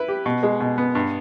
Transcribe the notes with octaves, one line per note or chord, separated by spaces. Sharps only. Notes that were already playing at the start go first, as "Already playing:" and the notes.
Already playing: E4 B4
G4
B2
G#3
B2
B3
G2